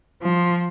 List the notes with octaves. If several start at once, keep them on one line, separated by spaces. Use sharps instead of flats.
F3